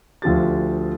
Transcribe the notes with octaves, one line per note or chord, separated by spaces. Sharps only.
D2 F3 G4 A6